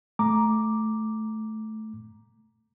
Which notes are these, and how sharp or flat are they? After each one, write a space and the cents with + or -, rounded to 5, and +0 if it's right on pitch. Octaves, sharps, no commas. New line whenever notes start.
A3 -10 A#5 +10 D6 +0